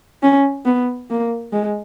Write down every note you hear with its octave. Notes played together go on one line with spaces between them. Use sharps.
C#4
B3
A#3
G#3